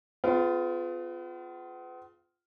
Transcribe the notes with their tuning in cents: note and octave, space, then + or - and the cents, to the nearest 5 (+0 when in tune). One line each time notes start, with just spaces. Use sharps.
B3 +40 F4 +0 G#4 +30